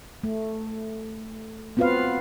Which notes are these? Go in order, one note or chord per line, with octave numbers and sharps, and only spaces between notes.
A3
B3 C4 F4 F#4 B4 F5